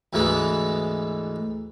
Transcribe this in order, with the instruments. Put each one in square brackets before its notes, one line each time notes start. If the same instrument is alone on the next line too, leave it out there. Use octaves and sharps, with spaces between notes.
[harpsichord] D2 G#2 D3 E3 G#3 B3